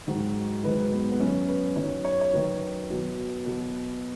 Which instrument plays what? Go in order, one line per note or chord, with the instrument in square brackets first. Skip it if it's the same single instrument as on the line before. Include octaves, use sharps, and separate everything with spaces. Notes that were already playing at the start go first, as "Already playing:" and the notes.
[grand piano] G#2 D#3 F#3 F#4
G#2 D#3 F#3 B4
B3
B3
F#2 F#3 C#4
B4
F#2 D#3 F#3 C#5
C#5
C#5
F#2 D#3 F#3 B4
B2 F#3
B2 F#3